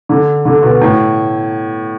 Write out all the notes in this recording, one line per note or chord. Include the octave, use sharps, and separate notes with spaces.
D3
D3
B2
A2